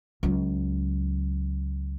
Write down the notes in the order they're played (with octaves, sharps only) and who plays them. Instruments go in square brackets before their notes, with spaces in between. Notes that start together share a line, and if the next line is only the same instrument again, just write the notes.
[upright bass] C#2 F#3